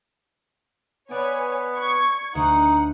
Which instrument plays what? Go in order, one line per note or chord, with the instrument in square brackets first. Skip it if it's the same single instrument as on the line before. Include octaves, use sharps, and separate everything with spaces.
[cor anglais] B3 [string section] B4 C#5 G#5 [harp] D5
[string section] C#6 G#6
[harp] D2 [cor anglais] D#4 [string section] F#5